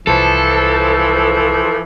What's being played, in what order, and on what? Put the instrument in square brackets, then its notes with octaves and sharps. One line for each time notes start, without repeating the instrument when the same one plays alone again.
[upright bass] C2 [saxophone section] E3 F3 [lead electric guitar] A4